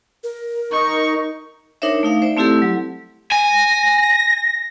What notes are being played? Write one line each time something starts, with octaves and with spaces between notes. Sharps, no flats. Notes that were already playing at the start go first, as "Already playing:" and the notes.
A#4
D#4 C#6
D4 D#4 A#4 C5 C#5 E5
A3 D#4 F5
C5 D5 E5
A3 C4 E4 G4 A4
F#3
G#5 A#6